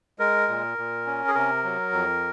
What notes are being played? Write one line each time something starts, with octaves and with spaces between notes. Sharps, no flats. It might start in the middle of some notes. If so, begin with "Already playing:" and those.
G#3 A#4
A#2
A#2
C#4
G#4
C3 A#4
F#3
F2